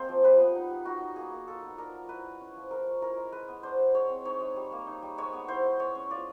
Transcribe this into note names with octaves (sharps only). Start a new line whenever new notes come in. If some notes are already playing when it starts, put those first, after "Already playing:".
Already playing: G#3 A#3 C4 C5
F3
G3 B4
B3
D#4
G3
D#4 F#4
D#4
A#3 G#4
A#3
F4 A4
B3
D4 A#4
F#3
E4 B4
G#3
C#4
F3
G#3 A#4
C#4
E4 A#4
G#3
G#3 B4
B3
D4 C5
G#3
G#3 C#5
C4
D#4 C#5
G#3
G3
A#3
D#4
G3
G#3 C#5
B3
E4 C5
G#3
G#3 C#5
C#4
F4 D5